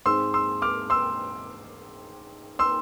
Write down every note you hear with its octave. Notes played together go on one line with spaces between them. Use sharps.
G#2 G#3 C4 C6 E6
C6 E6
D6 F6
C6 E6
C6 E6